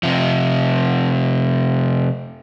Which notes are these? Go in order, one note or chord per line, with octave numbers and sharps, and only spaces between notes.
C3 F3